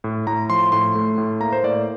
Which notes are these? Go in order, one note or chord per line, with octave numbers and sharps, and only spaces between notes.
A2
A2 A#5
F3 C6
A2 C6
A3
A2
A#3 A#5
C5
A2 D5